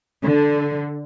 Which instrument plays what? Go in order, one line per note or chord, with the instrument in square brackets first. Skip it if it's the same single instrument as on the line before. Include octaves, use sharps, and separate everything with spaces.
[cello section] D3